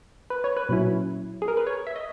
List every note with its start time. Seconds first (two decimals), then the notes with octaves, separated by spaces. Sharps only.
0.30 B4
0.44 C#5
0.57 B4
0.69 A#2 F#3 C#4 E4
1.42 G#4
1.48 A#4
1.57 B4
1.67 C#5
1.87 E5
1.96 D#5